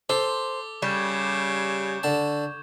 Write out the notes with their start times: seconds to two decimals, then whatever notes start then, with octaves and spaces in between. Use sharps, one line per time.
0.09 A4 C5 D6 G7
0.82 C#3 G3 C#6 G6 G#6
2.03 D3 A5